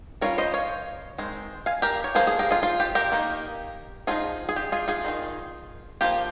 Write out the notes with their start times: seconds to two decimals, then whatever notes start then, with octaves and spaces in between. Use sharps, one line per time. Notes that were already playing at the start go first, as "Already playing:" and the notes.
0.21 G3 C#4 F4 A#4 C#5
0.38 C5 D#5
0.54 C#5 F5
1.18 D#3 G#3 C4
1.66 F5 G#5
1.82 G4 A#4
2.04 C#5
2.15 F3 A#3 F4 G#4 C5
2.27 G#4
2.39 G4 A#4
2.51 F4 G#4
2.63 F4
2.80 G4
2.95 G4 A#4
3.12 D#3 A#3 D#4
4.07 F3 C4 D#4 F4 G#4
4.49 G#4
4.56 G4
4.72 F4 G#4
4.88 F4 G#4
5.04 D#3 G#3 D#4
6.01 F3 A#3 F4 G4